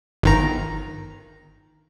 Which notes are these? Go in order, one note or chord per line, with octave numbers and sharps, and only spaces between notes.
G1 D#3 A#5